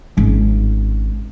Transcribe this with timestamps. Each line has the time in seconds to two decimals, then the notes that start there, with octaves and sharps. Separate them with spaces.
0.17 G#1 C#4